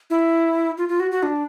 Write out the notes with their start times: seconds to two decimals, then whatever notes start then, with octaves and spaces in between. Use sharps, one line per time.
0.10 E4
0.78 F4
0.89 F4
1.00 F#4
1.11 F#4
1.23 D4